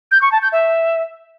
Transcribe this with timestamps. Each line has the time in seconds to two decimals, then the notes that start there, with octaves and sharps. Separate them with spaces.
0.11 G6
0.22 C#6
0.32 A5
0.42 G6
0.52 E5